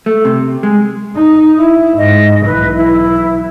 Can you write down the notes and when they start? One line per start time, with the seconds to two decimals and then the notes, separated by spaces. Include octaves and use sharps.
0.06 A3
0.25 C3
0.63 G#3
1.15 D#4
1.58 E4
1.97 G#2 D#5
2.46 B1 E3 B4
2.76 E4